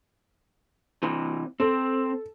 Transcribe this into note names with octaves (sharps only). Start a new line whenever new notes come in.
C3 E3
C4 A4